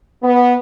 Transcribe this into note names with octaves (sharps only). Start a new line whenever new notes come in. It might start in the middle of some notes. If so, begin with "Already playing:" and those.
B3